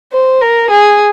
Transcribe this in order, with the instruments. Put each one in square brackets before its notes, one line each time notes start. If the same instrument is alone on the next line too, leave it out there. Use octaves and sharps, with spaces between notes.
[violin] C5
A#4
G#4